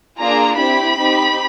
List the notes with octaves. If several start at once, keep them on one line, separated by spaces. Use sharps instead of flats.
A#3 D4 F4 G#4 A#5
C4 E4 G4 B5
C4 D#4 G4